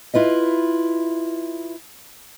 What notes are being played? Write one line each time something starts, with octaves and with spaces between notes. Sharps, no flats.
E4 F4 B4 D#5